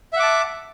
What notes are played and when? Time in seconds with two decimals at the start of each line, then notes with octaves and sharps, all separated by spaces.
0.13 E5
0.16 F#5
0.19 D6
0.22 A5